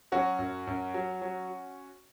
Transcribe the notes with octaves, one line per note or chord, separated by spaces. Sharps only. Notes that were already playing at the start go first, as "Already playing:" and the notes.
F#3 C#4 F#4
F#2
F#2
F#3
F#3